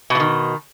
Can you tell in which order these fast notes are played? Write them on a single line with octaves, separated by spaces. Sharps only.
B2 E3 D#3